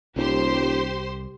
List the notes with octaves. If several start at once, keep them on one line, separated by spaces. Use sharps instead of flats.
D#1 C2 G4 C5 C6